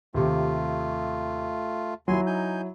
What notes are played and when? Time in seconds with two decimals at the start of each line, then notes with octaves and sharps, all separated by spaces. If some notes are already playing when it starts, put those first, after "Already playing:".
0.14 D#2 C3 A3 F4
2.08 D#2 F#3 E4 G#5 C6
2.27 D#4 G#5 G6